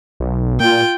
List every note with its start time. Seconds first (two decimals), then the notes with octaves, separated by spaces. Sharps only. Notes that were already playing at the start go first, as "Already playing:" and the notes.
0.20 B1
0.60 A#2 F4 G5